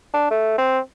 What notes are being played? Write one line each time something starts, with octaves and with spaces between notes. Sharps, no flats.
D4
A3
C4